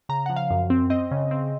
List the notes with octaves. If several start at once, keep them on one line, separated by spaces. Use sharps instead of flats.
C#3 A#5
F3 F#5
F5
F#2
C4
C4 D#5
C#3
C4